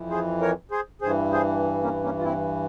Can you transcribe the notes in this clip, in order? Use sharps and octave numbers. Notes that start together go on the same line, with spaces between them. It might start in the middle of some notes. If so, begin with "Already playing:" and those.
Already playing: F2 E3
G#4 C5
A#4 C#5
G#4 C5
G2 E3 G#4 C5
G#4 C5
A#3 C#4
A#3 C#4
F4
C4 E4